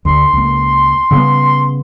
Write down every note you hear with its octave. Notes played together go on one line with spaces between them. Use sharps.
D2 C6
C#2 A#3
C#3 G3 B3